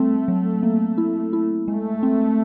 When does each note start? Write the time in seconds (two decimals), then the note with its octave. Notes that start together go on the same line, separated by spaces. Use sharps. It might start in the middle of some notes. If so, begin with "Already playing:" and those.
Already playing: G3 A3 C4
0.28 F#3
0.63 A#3
0.98 E4
1.33 E4
1.67 G#3 A3
2.03 C4